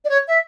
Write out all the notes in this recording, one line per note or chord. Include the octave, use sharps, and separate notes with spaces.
D5
C#5
E5